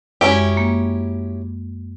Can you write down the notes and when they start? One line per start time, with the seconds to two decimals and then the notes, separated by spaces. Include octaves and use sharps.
0.21 F#2 G#3 C#4 E4 G4
0.57 A#3